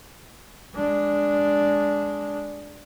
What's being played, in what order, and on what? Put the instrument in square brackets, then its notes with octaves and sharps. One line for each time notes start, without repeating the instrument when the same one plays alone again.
[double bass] G#3 D4